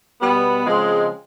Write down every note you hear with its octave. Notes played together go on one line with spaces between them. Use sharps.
B2 G3 B3
C#3 F3 G#3 C4